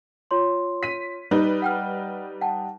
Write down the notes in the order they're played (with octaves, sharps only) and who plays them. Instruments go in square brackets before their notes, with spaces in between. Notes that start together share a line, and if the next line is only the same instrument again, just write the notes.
[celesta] F4 C#5 C6
[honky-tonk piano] B6 D#7
G3 D#4 B4
[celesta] F#5 G5 F6
F#5 G5 A5